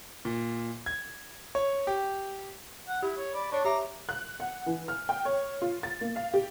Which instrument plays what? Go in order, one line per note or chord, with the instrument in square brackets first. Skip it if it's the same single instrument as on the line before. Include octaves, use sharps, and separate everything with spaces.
[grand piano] A#2
G#6
C#5
G4
[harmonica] F#5
[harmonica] E4 [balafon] G4
[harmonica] C#5
D5 B5
[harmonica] D4 C#6 [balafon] C#5 D5
[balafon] G4 E5 [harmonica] A#5 D6
[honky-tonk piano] F#6
F#5
E3
F6
G5
C#5
F4
A6
A#3
F5
G4